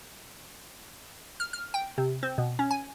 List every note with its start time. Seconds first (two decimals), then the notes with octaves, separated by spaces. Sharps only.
1.40 F6
1.53 F6
1.74 G5
1.98 C3
2.23 C4
2.38 B2
2.59 C#4
2.71 G#5